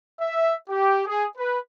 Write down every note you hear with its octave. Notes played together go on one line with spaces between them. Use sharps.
E5
G4
G#4
B4